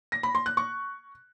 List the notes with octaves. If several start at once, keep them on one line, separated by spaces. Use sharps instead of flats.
A#6
B5
C6
F#6
C#6